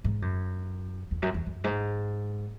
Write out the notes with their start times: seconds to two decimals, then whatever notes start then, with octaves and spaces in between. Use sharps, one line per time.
0.04 G#2
0.22 F#2
1.11 E2
1.22 F#2
1.34 E2
1.46 F#2
1.64 G#2